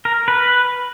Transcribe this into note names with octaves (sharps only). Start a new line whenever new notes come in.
A#4
B4